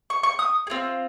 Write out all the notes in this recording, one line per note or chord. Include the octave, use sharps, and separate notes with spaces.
C#6
C#6
D#6
G#4
C4 F4